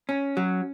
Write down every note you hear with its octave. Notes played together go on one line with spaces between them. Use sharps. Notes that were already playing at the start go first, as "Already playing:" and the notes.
C#4
F#3